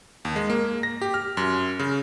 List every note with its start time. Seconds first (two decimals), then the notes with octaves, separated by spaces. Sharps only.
0.25 D#2
0.36 G#3
0.50 A#3
0.83 A#6
1.01 G4
1.14 F6
1.37 F#2
1.79 C#3